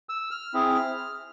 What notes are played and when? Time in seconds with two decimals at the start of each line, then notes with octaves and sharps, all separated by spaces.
0.09 E6
0.31 F6
0.54 C4 E4 G#4